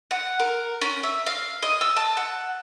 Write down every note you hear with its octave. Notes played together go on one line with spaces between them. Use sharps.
F#5
A#4
C#4
E5
F5
D#5
E6
A5
F#5